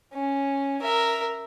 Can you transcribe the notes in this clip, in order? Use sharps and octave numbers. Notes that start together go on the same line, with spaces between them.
C#4
A#4 E5